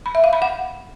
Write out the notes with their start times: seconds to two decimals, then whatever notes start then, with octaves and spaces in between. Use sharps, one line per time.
0.06 B5
0.15 E5
0.24 F5
0.33 B5
0.42 F#5